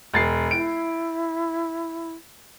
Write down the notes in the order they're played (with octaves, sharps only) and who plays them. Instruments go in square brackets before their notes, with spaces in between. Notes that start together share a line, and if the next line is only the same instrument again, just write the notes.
[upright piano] E1 A6 C7
[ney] E4 [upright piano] D7